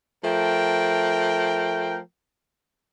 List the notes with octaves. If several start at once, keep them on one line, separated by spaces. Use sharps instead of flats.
F3 A3 A#4 G5